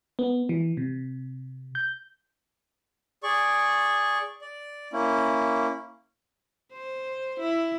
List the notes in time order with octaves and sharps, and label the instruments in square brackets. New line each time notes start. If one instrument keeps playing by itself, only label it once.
[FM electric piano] B3
E3
C3
G6
[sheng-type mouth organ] G#4 D5 C#6
D5
A#3 C#4 E4
[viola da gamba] C5
E4